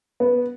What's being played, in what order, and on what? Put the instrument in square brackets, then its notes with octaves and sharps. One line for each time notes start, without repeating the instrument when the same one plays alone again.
[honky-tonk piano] B3